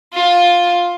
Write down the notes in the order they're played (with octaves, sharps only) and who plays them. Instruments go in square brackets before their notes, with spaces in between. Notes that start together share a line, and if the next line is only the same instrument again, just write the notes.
[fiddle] F4